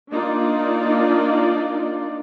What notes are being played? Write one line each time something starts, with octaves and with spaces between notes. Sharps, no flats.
A#3 D4 D#4 F4 D5